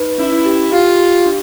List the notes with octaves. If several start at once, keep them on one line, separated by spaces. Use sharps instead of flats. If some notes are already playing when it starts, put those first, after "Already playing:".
Already playing: D#4 B4
C#4 E4
G4
F4 G4
G4
D4